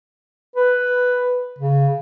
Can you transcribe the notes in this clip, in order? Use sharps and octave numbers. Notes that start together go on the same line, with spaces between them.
B4
C#3